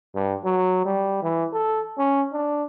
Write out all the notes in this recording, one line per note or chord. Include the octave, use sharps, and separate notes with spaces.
G2
F#3
G3
E3
A4
C#4
D4